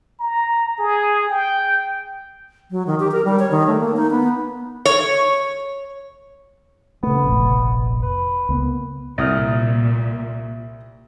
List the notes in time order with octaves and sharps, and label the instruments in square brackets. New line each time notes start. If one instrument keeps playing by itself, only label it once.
[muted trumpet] A#5
G#4
G5
[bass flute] F#3
D#3
G4
A#4
G3
C#5
D#3
A3
A#3
D#4
B3
[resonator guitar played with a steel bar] C#5
[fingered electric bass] C#3 A3 [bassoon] B3
[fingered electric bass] F1 A#1
[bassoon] B4
[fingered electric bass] C#2 A#3 B3
[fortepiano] C2 D#6 F6 [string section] A#2